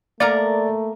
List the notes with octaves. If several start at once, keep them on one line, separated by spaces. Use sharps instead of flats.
A3 A#3 A#4 D5 A#5 A6